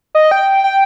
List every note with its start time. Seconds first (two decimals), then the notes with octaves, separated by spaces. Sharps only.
0.15 D#5
0.31 G5
0.64 G5